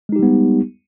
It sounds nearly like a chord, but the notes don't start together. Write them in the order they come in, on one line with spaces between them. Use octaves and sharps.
G#3 D#4 G4 G3 B3